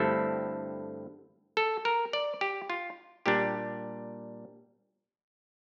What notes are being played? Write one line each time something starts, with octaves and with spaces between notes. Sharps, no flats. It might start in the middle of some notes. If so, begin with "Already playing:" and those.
Already playing: G2 D3 A3 C4 E4 A4
A4
A#4
D5
G4
F4
A#2 G3 D4 G4